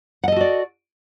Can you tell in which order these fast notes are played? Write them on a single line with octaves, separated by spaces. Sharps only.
F#5 D#5 A4 F#4 D5